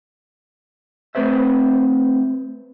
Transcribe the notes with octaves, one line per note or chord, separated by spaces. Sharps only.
A3 C4 B4 C5 E5